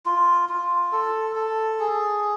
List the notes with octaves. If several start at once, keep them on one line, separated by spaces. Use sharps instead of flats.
F4
F4
A4
A4
G#4